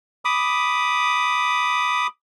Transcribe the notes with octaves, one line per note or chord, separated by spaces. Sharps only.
B5 D6 D#6